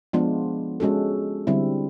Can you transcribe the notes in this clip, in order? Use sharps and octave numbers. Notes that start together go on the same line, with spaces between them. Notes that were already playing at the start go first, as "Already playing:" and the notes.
F3 G#3 B3 D4 F4
G#3 C#4 F#4 A4
D3 G3 C4 E4